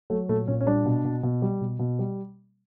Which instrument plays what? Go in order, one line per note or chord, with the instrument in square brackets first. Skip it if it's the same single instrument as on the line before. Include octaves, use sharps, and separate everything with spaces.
[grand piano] F#3 A3
A#2 A3
A#2 C#4
C#4
G3 D4
B2
B2
B2
G3
B2
B2
G3